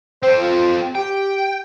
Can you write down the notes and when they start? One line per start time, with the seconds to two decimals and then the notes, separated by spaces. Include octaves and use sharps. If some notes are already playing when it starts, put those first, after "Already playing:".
0.23 C4 A4 C5
0.38 F4
0.95 G4 G5